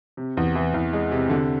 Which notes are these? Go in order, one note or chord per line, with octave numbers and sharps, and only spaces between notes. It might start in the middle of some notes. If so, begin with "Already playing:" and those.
C3
E2
E3
E2
G#3
C3
D3